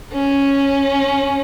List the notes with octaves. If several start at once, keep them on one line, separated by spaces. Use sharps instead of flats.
C#4